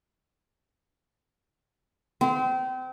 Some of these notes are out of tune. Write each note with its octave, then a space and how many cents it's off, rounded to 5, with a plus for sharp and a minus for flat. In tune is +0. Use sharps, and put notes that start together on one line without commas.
C4 -30